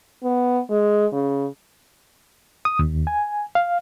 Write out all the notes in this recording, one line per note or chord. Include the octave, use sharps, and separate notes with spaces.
B3
G#3
C#3
D#6
D#2
G#5
F5